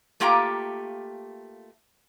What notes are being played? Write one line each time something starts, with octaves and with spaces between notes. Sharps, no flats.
A3 A#3 F4 G4 G5 A#5